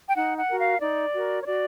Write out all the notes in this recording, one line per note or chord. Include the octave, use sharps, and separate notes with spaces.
G5
D#4 F#5
F#5
F#4 A#4
F5
D#4 D5
F#4 A#4
C#5
F#4 D5